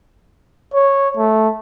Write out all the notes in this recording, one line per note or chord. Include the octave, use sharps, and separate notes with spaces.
C#5
A3